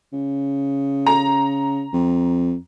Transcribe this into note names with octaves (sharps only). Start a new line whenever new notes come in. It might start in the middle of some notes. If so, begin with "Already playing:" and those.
C#3
A#5
F2